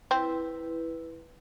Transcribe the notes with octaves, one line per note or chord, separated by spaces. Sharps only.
C4 E4 B4